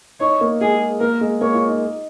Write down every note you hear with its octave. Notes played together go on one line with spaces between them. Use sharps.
D#4 C#5
A#3
G#3 G#4
A#3 A#4
G#3
A#3 C#5
F4
D#4